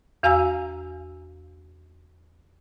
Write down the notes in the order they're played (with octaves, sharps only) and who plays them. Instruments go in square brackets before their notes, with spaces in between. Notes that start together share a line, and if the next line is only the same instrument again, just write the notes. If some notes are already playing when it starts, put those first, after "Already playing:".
[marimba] E2 F#4 F5 G#5 A#5 E6